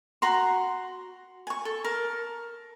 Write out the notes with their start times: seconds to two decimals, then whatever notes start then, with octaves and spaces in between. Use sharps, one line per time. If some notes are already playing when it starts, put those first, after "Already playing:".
0.22 F#4 A#5 C6
1.47 G#5 C#6
1.65 A4
1.84 A#4 A5